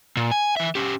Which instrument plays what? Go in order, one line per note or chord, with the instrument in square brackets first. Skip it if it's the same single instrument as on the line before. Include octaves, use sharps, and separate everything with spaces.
[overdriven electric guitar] A#2
G#5
E3 E5
C#4 G4